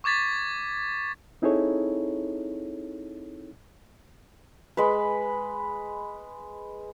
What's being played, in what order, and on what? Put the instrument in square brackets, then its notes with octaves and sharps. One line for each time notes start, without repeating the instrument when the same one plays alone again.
[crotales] C#6 D6 G#6 A6 B6
[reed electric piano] C4 D#4 E4 G#4 A4 C#5
[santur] G#3 B4